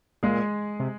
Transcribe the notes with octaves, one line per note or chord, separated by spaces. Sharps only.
A#2 G#3 G#4
C3